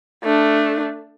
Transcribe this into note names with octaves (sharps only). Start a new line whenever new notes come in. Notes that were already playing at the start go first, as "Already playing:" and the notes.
A3 D4